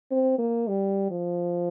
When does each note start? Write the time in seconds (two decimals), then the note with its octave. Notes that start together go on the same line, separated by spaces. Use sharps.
0.11 C4
0.39 A#3
0.68 G3
1.10 F3